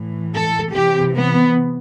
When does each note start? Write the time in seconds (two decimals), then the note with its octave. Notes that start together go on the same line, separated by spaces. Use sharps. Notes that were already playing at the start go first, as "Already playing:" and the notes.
Already playing: A2 E3
0.33 A4
0.73 C3 E3 G4
1.14 B3